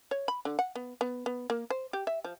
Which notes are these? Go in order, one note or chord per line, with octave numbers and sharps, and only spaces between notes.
C#5
B5
D3
F#5
B3
B3
B3
A#3
C5
G4
E5
F3